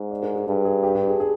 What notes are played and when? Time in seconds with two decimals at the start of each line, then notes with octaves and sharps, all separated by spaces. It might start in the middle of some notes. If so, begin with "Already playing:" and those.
Already playing: G#2
0.11 D5
0.23 A#4
0.35 G#4
0.47 G2 G#4
0.65 G#4
0.83 G4
0.95 G4
1.07 G#4
1.20 G#4